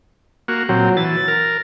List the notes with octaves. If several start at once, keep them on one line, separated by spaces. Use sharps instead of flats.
A#3 F#4
A#2 F#3 C4
E3 A6
A#4